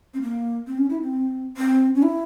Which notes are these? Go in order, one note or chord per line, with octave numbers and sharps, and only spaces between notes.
C4
A#3
C4
C#4
E4
C4
C4
C#4
E4